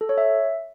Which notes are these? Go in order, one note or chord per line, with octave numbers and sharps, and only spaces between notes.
A4
C#5
E5